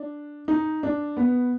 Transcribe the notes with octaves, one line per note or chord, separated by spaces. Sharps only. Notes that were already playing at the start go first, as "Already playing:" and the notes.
Already playing: D4
D#4
D4
B3